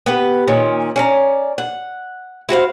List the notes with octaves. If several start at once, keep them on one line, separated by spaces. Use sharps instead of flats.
B3 G4 B4
A#2 D#3 C#4
C#4 D5 A#5
F#5
E4 F#4 C5 F5